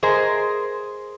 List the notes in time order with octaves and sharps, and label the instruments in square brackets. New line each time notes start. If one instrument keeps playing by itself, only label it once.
[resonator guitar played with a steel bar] G#4 A#4 C5 D#5